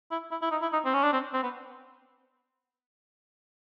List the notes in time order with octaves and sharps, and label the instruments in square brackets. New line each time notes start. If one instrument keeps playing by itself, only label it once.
[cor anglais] E4
E4
E4
D#4
E4
D#4
C4
C#4
D4
C4
C4
B3